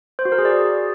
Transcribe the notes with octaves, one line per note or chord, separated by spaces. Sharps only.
C5
F#4
A#4
G#4
D5